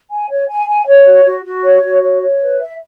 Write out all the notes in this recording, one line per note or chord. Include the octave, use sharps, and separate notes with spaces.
G#5
C#5
G#5
G#5
C#5
F#4
F#4
F#4
C#5
F#4
C#5
C#5
B4
E5